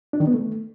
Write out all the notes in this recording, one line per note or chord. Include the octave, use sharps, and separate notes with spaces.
D4
D#3
B3
A3